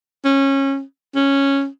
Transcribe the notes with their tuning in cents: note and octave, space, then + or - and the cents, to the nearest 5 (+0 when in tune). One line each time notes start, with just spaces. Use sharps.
C#4 -20
C#4 -5